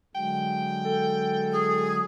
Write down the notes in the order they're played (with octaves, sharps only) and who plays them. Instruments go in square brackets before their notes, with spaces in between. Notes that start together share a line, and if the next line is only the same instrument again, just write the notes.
[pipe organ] D3 F#3 G#3 [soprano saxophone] G5
[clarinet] A4
[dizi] G#4